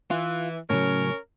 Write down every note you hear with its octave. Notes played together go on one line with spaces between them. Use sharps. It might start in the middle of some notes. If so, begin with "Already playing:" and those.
E3 F4
A2 C#3 F#3 C#4 A#4 C#5